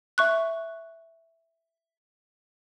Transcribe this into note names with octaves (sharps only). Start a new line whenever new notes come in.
E5 C#6 F#6